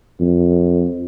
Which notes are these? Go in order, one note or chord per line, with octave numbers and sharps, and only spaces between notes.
F2